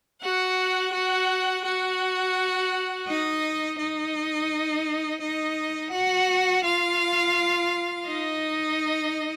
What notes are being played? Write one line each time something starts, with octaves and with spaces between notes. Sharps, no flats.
F#4 F#5
F#4 F#5
F#4 F#5
D#4 D#5
D#4 D#5
D#4 D#5
F#4 F#5
F4 F5
D#4 D#5